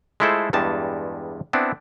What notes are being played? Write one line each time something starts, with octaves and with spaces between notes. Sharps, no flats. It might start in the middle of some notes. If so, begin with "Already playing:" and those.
G#3 A3 E4 F4 A4 C5
E2 G2 G3 G#3 A5
B3 C4 D4 E4